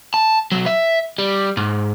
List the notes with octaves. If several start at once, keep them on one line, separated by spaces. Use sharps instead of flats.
A5
B1 F#3
E5
G3
G#2